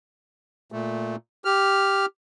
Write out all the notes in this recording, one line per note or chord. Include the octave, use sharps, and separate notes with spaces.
A#2 A3
G4 F6